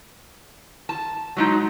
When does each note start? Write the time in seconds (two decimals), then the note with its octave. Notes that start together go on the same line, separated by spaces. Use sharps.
0.89 A5
1.37 F#3 G#3 D#4